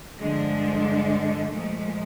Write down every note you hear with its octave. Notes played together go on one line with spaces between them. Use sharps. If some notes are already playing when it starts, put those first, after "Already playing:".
G2 D3 F3 G#3
A#2 F3 G#3 A3